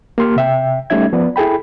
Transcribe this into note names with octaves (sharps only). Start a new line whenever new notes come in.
A#3 G4 C6 F6
C3 E5 G5
G3 A3 C#4 D#4 E5 G#6
F3 B3 D5
E4 G#4 A4 G5 B5